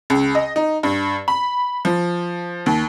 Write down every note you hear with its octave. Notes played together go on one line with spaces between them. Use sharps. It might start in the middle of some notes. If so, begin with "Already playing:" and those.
C#2
D#5
D#4
G2
B5
F3
D#2